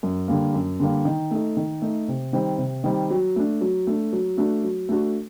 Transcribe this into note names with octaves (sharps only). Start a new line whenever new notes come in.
F#2
D3 G3 A#3
F#2
D3 G3 A#3
D#3
A3 D#4
D#3
A3 D#4
C3
D#3 G3 C4
C3
D#3 G3 C4
F#3
A3 D4
F#3
A3 D4
F#3
A3 D4 F#4
F#3
A3 D4 F#4